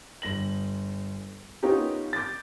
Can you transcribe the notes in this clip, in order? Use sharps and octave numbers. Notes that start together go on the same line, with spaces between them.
G1 A#6 F#7
B3 C#4 D#4 F4 G4 A#4
D6 G6 A6